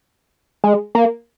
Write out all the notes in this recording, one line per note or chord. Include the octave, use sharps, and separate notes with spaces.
G#3
A#3